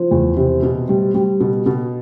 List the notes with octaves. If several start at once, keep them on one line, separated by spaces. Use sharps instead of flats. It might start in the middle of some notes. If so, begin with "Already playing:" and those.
Already playing: F3 C5
E2
C3
B2
G3
G3
B2
B2